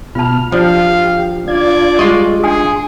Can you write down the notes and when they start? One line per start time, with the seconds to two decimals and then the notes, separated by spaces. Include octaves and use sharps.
0.15 B2 F4 A5 F6
0.52 F3 D4 G4 F5
1.48 D4 F4 D5 G#6
1.99 G3 G#3 F4 D#5 C#6
2.43 D4 G#4 G#5 C6 D#6